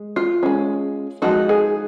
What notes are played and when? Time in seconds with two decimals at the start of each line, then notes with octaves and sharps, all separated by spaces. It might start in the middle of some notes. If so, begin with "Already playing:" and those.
Already playing: G#3
0.16 F4
0.43 G#3 C#4
1.22 F3 G#3 D#4 F#4
1.49 G#4